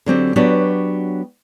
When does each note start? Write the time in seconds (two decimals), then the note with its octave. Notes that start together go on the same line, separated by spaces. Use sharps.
0.06 D3 F#3 C4 G4
0.36 F#3 B3 D4 F#4 G4 C#5